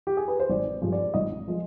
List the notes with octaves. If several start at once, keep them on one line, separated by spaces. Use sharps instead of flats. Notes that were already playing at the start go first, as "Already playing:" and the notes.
G4
G#4
B4
C5
G#1 D5
G2 F3 G#3
D5
G#1 D#5
F3 G#3